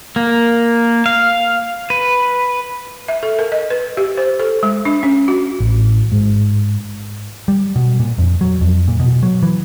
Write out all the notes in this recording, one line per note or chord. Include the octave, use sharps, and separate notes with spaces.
A#3
F5
B4
E5
A4
A#4
D#5
B4
G4
C5
A4
G#3
D4
C#4
F#4
A1
G#2
G3
B2
A#2
F2
F#3
F2
A#2
B2
F#3
E3